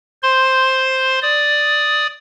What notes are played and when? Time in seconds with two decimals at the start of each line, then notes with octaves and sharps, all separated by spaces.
0.23 C5 C6
1.22 D5 D#6